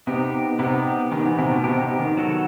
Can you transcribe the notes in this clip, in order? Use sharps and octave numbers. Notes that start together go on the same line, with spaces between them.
C3 B3 D#4 G4
C3 B3 D#4 G4
D#3 B3 D#4 G4
E3
C3
B2
C3 B3 D#4 G4
C3
D#3
F#3 B3 F#4 A4